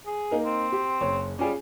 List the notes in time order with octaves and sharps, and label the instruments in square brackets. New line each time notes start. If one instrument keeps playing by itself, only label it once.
[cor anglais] G#4
[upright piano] A#3 D#4 A#4
[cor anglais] C4
[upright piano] G4
F#1 C#5
[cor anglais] G3 [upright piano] C#4 F4 G#4